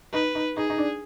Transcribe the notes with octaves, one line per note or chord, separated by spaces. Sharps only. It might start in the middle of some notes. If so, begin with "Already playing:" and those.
D#4 B4
D#4
D#4 G#4
D#4
D4